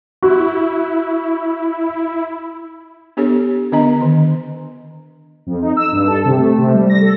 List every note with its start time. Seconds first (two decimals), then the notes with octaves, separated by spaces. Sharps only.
0.22 E4 F#4
3.17 B3 D4 G4 A4 C#5
3.72 D3 B3 D4 D#5 A#5
4.01 D#3
5.47 F2
5.62 D#4
5.77 E6
5.92 G2
6.07 A4
6.25 C3
6.38 A3
6.58 C3
6.74 G3
6.90 A#6
7.02 A4